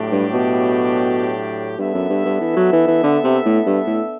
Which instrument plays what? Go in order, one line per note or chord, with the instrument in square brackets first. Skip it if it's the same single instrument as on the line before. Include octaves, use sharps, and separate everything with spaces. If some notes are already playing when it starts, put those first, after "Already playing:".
Already playing: [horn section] A2 F#3 A3 D4 G4
[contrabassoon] G2
B2
[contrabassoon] G2 [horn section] B3 D4 A4 E5
[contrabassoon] F#2
G2
G2
E3
F#3
E3
E3
D3
C3
A2
G2
A2